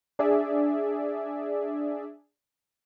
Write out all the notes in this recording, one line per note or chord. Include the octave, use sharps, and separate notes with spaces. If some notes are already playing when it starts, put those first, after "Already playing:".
D4 G#4 D5 E5